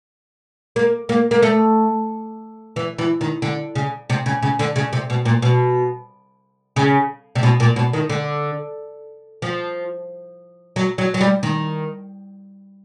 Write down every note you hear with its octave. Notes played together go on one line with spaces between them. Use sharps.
A#3
A#3
A#3
A3
E3
E3
D#3
D3
C#3
C3
C#3
C#3
D3
C#3
C3
B2
A#2
B2
C#3
C3
B2
A#2
B2
D#3
D3
F3
F#3
F#3
F#3
G3
D#3